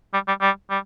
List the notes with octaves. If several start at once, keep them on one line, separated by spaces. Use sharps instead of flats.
G3
G3
G3
G3